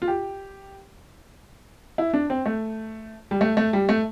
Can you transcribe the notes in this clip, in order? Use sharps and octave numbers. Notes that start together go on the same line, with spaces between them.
F4
G4
E4
D4
C4
A3
G3
A3
A3
G3
A3